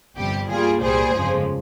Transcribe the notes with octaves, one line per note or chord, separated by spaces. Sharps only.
G1 F2 C3 G3 G4
G2 G3 A#3 F4 G#4
C2 A#2 G3 A#3 G#4 C5
G1 F2 C#3 F3 G#3